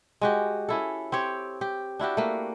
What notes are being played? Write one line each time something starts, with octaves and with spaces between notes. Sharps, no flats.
G#3 F#4 G4
C#4 E4 A4
C4 G4 C#5
G4
D4 E4 F#4 G4
A3 A#3